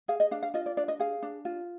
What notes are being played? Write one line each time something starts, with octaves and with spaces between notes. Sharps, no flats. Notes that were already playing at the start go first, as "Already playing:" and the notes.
G#4 F5
D#5
D4 F5
F5
F4 D#5
D5
D4 D5
D#5
G#4 F5
D4
F4